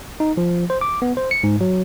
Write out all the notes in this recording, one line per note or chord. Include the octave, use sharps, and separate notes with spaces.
D#4
F3
C5
D6
B3
C5
C#7
G#2
F#3